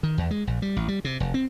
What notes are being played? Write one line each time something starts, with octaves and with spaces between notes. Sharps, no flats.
D#3
E2
G#3
A#1
G3
A1
G3
C3
F1
C4